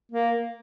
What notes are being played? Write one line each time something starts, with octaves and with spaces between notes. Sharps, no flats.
A#3